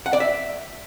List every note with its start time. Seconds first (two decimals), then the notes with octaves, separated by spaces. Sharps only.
0.06 F#5
0.13 D5
0.20 E5